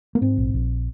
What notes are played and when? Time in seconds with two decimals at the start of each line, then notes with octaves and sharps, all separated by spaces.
0.15 A#3
0.21 G#2 C4
0.37 A#1
0.54 A#1